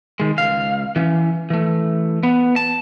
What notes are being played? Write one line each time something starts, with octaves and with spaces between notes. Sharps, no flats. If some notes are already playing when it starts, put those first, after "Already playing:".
D#3 G#3
C#2 F5
E3 C#4
E3 A3
B3
A5